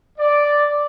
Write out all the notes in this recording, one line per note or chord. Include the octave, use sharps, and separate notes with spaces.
D5